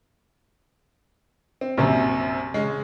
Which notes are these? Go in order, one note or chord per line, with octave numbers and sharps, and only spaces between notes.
C4
A#1 F#2 C3
C#3 G#3 C#4